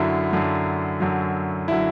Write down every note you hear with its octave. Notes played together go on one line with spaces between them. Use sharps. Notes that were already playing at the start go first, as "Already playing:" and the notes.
Already playing: F#2 D3 F#3 E4
F#2 D3 F#3
F#2 D3 F#3
D3 F#3 E4